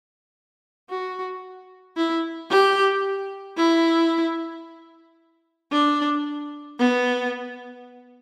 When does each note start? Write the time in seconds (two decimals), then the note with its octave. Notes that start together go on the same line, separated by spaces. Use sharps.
0.90 F#4
1.97 E4
2.50 G4
3.57 E4
5.72 D4
6.80 B3